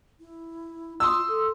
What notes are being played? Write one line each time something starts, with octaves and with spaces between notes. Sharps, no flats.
E4
F4 C6 D#6 E6
A4